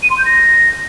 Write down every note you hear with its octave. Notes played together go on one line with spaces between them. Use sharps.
D#7
C6
G6
A#6